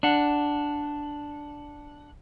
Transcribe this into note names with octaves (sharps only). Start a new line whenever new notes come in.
D4 F#5